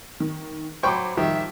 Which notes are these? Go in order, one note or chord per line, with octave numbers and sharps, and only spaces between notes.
D#3
F#3 C5 G5 B5 C#6 D6
D#3 F3 G3 E5